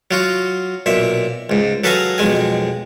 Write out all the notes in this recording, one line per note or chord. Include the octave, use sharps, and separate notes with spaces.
F#3 F4 F#4
B1 A#2 E5
C#2 G#2
F#3 A4 B4 F5 G#5 A#5
B1 F2 G#3 G#5